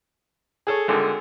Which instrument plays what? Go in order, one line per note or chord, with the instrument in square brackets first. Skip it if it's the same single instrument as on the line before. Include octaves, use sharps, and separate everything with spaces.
[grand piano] G#4 A4 C#5
[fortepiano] G#1 D3